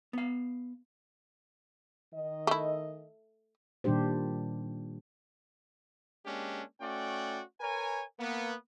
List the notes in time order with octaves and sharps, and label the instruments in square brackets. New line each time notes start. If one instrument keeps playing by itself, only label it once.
[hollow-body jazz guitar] B3 F5
[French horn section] D#3 D#5
[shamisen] A3 E4
[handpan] A#2 D#3 G3 D4 G4 C5
[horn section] G#3 A#3 C#4 D4 G4
A3 C#4 F#4 D5 G5
A#4 B4 C#5 G#5
A#3 B3